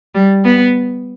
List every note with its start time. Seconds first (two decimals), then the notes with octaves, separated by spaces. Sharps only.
0.15 G3
0.44 B3